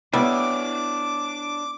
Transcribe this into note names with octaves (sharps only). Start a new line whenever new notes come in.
G3 B3 D4 E4 C#5 D6